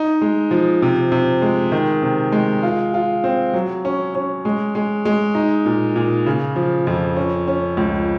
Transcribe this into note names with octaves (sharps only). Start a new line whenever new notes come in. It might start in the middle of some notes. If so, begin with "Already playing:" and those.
Already playing: D#4
G#3
F3
C3
C3
G#3
D#3
C3
G#3
F4
F4
C4
F#3
C#4
C#4
G#3
G#3
G#3
D#4
A#2
A#2
C#3
F3
F2
C#4
C#4
C#2